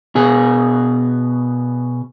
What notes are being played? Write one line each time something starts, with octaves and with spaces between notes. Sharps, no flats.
B2 G#4